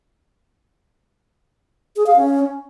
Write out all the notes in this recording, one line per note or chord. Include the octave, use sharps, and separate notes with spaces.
G#4
F5
C#4